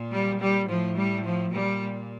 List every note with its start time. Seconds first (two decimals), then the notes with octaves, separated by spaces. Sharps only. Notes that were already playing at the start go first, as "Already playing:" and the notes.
Already playing: A#2
0.11 G3
0.40 G3
0.68 A2 F3
0.97 G3
1.25 F3
1.53 A#2 G3